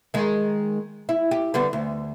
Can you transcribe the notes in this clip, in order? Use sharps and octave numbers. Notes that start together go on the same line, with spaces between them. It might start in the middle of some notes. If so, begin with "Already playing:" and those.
D#3 G#3
E4
G4
D3 G3 B3
D2